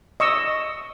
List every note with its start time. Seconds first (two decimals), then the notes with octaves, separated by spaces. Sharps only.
0.20 D#5 C#6 E6